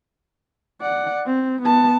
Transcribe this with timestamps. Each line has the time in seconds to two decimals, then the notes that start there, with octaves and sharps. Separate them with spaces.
0.82 D5 F#5
1.26 C4
1.62 B3 A5